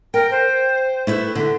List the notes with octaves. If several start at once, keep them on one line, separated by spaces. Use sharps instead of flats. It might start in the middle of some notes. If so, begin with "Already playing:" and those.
A#4 G5
C5
A3 E4 B4
D3